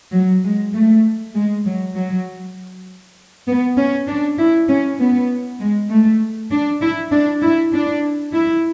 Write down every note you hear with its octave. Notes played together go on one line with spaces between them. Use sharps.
F#3
G#3
A3
G#3
F#3
F#3
B3
C#4
D4
E4
C#4
B3
G#3
A3
D4
E4
D4
E4
D4
E4